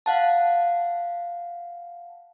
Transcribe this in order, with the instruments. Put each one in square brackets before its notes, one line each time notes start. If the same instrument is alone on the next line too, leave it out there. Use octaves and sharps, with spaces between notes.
[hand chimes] F5 F#5 A5